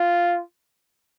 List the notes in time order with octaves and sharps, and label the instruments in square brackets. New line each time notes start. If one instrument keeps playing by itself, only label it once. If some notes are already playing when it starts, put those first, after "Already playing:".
Already playing: [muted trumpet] F4